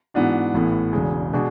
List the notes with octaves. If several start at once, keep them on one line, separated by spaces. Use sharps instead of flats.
G#2 E3 B3 D4 F#4
A1 A2 E3 B3
E1 E2 C#3 G#3
B2 G#3 D4 F#4